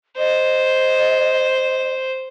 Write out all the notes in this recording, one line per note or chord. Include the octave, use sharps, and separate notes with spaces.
C5 D#5